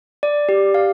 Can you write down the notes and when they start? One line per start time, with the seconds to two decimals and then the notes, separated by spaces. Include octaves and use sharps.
0.23 D5
0.49 G4
0.74 F5